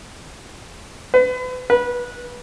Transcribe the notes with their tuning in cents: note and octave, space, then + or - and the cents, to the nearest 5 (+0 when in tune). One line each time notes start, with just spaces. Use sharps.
B4 +35
B4 -20